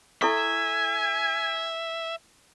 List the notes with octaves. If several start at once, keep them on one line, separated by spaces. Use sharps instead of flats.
E4 A4 E5 G#5 C#6